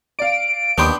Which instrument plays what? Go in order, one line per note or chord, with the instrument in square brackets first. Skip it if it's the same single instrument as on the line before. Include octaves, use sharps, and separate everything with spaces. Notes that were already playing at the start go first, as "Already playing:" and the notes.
[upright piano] D5 F5 [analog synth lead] D7
[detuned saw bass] D#2 [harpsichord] B3 D4 G5 [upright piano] B5 C6 D#6